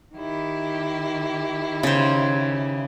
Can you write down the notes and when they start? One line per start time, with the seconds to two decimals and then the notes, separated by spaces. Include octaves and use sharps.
0.15 D#3 E4 G4
1.83 C#3 C5